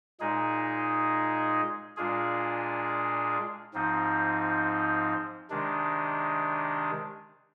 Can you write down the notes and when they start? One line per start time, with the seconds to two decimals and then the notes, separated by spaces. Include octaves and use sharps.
0.20 A#2 G#3 D#4 G#4
1.97 A#2 G#3 D4 F4 G#4
3.74 G#2 F3 C4 D#4
5.50 C3 D#3 G#3 D4